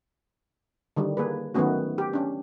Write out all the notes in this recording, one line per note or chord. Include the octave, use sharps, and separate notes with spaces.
D3 D#3 G3
A#3 G#4 B4
D#3 F#3 A3 B3 C#4 F#4
G4
C#4 D4